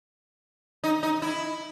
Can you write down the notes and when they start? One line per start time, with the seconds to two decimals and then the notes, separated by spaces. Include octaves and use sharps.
0.84 D#4
1.03 D#4
1.22 E4